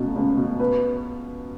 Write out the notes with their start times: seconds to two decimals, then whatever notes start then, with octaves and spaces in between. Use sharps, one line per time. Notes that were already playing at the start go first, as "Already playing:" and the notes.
Already playing: C#2 B2 A3
0.15 C#2
0.37 B2
0.60 B4